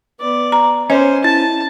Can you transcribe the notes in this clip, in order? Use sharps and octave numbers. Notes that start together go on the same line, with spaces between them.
B3 D5
A#5
C#4 C5 D#5
E4 A5 A6